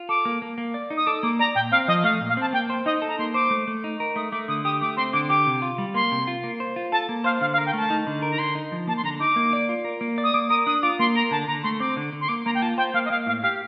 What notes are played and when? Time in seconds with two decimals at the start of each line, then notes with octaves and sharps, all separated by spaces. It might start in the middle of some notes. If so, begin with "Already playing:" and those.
Already playing: F4
0.09 A4 D6
0.25 A#3
0.42 A#3
0.58 A#3
0.74 D5
0.90 D#4
0.97 D#6
1.07 A4 D6
1.23 A#3 D6
1.39 D5 A#5
1.55 A#2 G5
1.72 C4 F5
1.88 F3 D#5
2.04 A3 F5
2.21 A#2
2.29 F5
2.37 C4 A5
2.53 A#3 G5
2.70 C5
2.86 D#4 D#5
3.02 A4
3.08 A#5
3.19 A#3 C6
3.34 C5 D6
3.50 A3
3.67 A3
3.84 D#4
4.00 A#4
4.16 A3 D#6
4.32 A3 D6
4.48 D3 D#6
4.64 G4 D#6
4.81 A3 D6
4.97 C4 C6
5.13 D3 D6
5.29 G4 D6
5.46 C3
5.62 F4
5.78 G3
5.94 A#3 C6
6.12 C3
6.27 F4
6.44 A#3
6.60 C5
6.76 F4
6.92 A4 A5
7.09 A#3
7.24 C5 F5
7.41 D3 F5
7.53 F5
7.58 A#4
7.66 G5
7.73 A3 A5
7.90 D#4
8.07 D3
8.22 A#4
8.31 A#5
8.39 D3 C6
8.55 D#4
8.72 F3
8.88 A#3 A5
8.97 C6
9.04 D3 A#5
9.19 D#4 D6
9.36 A#3
9.53 D5
9.69 F4
9.85 A#4
10.01 A#3
10.18 D5
10.24 D#6
10.34 A#3 D6
10.50 A#4 D#6
10.67 D4 D#6
10.82 F4 D6
10.99 A#3 C6
11.15 A#4 A#5
11.31 D3 A5
11.48 D3 A#5
11.63 A3 C6
11.80 C4 D6
11.97 D3
12.13 D3
12.21 C6
12.29 A#3 D6
12.46 A#3 A#5
12.55 G5
12.62 F4 A5
12.78 C5 G5
12.94 A#3 F5
13.05 D#5
13.10 A#3 F5
13.26 A2 F5
13.42 G4 F5